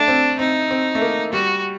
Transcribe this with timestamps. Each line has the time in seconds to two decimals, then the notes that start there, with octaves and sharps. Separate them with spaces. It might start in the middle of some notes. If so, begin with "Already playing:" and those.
Already playing: A3 D4
0.08 C4
0.39 C4 D#4
0.71 C4
0.95 A3
1.01 A#3
1.33 G3 F#4